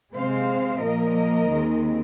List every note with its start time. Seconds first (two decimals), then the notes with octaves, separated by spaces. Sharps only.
0.14 C3 G#3 C4 C5 F5
0.81 A#2 F3 A#3 A#4 D#5
1.47 D#2 D#3 G#3 C4